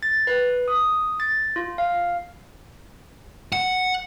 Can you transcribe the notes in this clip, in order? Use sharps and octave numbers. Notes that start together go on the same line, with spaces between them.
A6
B4
D#6
A6
F4
F5
F#5